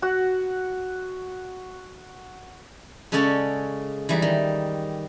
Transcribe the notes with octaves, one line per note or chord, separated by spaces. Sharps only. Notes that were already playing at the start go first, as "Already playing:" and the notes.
F#4 F#5
C#3 G#3 C#4 A4 C#5 D5
E3 G3 D#4
D#3